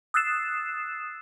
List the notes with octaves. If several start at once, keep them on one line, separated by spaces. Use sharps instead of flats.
D#6 E6 F#6 A6 C7 E7